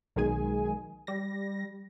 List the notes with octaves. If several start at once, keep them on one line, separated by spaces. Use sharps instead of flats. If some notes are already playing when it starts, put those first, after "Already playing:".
B1 D#3 G#3 G#4 G#5
G3 A#6